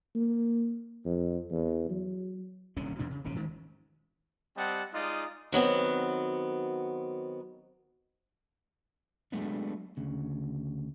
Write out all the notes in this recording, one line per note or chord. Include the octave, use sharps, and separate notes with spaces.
A#3
F2
E2
F#3
D#1 C2 D3 C#4
E2 B2 D4
C#3
D#1 G#1 C#3 C#4
D#3 G#3
G3 C4 D#5 F#5 A5
G#3 D#4 F4 D5 D#6
D#3 F#3 B3 C4
F#3 G#3 A3 B3 D4
D2 C#3